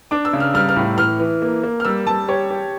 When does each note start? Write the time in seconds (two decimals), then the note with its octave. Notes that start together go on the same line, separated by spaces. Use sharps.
0.11 D4 D6
0.25 E6
0.33 C#3
0.40 F6
0.54 G3 F6
0.69 F6
0.76 A2
0.98 E3 F6
1.20 E3
1.42 A#3
1.63 A#3
1.80 F6
1.85 G3 E6
2.06 G3 A5
2.28 G4 C#5
2.50 G4